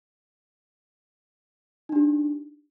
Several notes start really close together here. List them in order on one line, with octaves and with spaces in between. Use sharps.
D#4 D4 G4